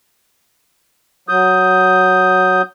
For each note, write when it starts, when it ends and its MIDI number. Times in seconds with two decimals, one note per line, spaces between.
1.29 2.62 54
1.29 2.62 87
1.29 2.62 91